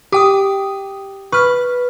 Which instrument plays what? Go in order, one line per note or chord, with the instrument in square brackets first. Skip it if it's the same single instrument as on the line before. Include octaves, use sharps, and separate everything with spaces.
[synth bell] G4 G5 D#6 [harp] D6
[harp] B4 [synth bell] C#6 F6